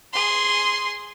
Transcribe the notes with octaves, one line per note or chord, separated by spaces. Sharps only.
G#4 C6